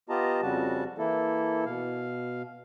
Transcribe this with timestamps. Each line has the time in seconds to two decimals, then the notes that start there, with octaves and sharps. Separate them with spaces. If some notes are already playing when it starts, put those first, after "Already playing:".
0.09 B3 F4 G4 D#5 A5 A#5
0.42 F2 C#3 G3 F#4 A5
0.98 E3 A#3 E4 A4
1.65 B2 F5